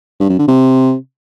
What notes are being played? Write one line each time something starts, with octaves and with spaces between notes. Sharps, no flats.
G2
F#2
D3
C3